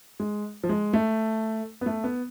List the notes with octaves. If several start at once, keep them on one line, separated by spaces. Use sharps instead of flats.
G#3
F3
G#3
A3
B3
A3
B3